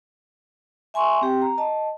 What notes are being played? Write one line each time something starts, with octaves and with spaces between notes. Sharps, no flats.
E5 G#5 C6 C#6
C4 G4 G5
A#5
D#5 A5